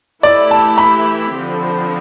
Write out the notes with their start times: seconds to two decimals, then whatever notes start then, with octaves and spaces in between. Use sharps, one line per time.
0.23 E3 A3 E4 G4 D5
0.51 A5
0.78 B5
1.33 D3 F3 C4